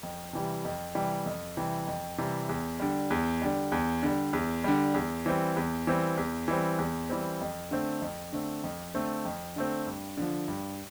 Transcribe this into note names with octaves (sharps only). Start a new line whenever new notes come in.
F2
C3 E3 G3
F2
C3 E3 G3
F2
C3 E3 G3
F2
C3 E3 G3
E2
D3 G3
E2
D3 G3
E2
D3 G3
E2
D3 G3
E2
E3 G3 C4
E2
E3 G3 C4
E2
E3 G3 C4
E2
E3 G3 C4
F2
D3 A3 C4
F2
D3 A3 C4
F2
D3 A3 C4
F2
D3 A3 C4
G2
D3 F3
G2